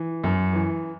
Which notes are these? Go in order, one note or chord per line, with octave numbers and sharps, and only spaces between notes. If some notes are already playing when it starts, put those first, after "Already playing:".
Already playing: E3
F#2
E3